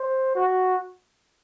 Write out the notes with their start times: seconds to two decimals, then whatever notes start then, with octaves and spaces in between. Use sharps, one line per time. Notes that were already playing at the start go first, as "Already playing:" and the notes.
Already playing: C5
0.35 F#4